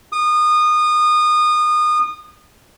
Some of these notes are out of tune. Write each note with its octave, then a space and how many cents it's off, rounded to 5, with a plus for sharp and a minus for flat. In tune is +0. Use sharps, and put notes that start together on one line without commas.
D#6 -25